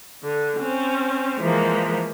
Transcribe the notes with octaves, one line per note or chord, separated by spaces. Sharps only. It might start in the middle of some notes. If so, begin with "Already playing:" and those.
D3
C4 C#4
E3 F3 G#3 A#3